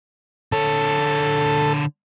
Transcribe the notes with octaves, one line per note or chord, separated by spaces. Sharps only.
D3 A4 C#5